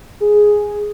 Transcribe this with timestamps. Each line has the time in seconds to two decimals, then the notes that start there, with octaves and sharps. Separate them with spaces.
0.20 G#4